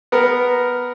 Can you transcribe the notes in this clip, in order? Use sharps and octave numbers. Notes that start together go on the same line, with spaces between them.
B3 A#4